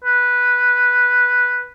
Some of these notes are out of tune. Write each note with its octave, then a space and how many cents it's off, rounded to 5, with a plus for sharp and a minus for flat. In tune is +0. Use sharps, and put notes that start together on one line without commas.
B4 -5